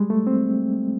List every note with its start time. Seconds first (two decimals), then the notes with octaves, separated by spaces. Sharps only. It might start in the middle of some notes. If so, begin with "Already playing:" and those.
Already playing: G3 G#3
0.10 A3
0.27 C4